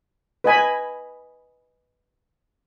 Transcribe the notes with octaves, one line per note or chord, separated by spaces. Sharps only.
B4 D#5 G#5 B5